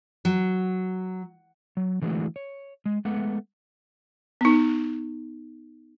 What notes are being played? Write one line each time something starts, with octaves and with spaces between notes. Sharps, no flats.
F#3
F#3
D3 E3 G#3 A3 E4 F#4
C#5
G#3
G#3 A3 B3 F#5
B3 D#4